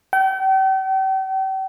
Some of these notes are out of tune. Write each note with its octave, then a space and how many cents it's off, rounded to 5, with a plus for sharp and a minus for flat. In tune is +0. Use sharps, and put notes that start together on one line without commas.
G5 -40